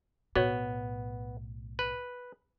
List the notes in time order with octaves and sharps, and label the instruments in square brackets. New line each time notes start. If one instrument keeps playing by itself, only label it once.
[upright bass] B1 A2 [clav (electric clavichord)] B3 [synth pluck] F#4 C#5
[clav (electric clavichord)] B4